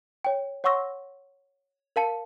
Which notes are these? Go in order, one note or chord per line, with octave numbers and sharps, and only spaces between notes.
C#5 G5
C#5 F#5 C6 C#6 E6 A#6
A#4 F5 A5 C#7